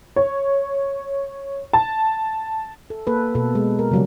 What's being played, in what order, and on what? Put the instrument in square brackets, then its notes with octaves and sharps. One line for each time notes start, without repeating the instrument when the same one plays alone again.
[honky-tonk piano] C#5
A5
[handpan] A4
A#3 A4 B4
B2 A4
G#3
A#4
C#3 F#3 G3